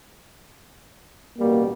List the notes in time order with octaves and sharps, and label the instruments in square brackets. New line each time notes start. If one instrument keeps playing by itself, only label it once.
[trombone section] A1 B2 G3 [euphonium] A#3